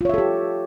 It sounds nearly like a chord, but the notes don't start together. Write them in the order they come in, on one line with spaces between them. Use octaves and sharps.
F4 C#5 E5 A4 G4